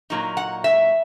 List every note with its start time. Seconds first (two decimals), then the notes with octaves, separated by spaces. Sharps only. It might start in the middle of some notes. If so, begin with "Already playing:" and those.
0.10 A#2 F#3 A#3 D#4
0.37 F#5
0.64 E5